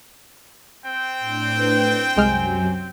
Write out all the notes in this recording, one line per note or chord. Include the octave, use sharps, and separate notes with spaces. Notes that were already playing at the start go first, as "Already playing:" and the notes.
C4 G5
A2 D4
B4
C2 F#2 C3 F#3 G#3 G#5 F6